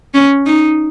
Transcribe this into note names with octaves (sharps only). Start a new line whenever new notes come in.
C#4
D#4